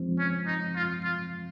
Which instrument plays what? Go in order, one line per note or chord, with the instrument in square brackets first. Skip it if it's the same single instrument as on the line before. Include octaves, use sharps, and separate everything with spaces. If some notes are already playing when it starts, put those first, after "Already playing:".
Already playing: [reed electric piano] F3 G#3 C4
[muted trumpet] C#4
D#4
F4
F4